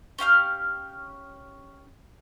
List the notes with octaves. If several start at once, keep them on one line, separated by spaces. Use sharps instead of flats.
C#4 G4 F5 F6